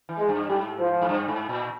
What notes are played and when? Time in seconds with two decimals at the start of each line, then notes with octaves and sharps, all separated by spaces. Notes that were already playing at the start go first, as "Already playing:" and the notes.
0.09 E3
0.19 G#3
0.29 G2
0.49 G#2 G3
0.79 F3
1.02 G#2
1.09 G2
1.28 G#2
1.49 A#2